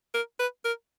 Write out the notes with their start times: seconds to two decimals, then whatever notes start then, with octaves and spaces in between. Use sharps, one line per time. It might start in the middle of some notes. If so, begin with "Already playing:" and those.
0.14 A#4
0.39 B4
0.65 A#4